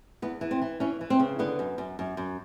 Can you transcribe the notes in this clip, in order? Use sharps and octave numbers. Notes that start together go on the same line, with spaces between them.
E2 B3
E3
C4
E3
E3 C#4
E3
C4
C#3
D3 B3
F#2
F#2
F#2
F#2